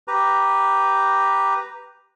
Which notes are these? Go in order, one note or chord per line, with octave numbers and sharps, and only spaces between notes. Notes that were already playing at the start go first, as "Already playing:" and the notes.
G4 B4 A#5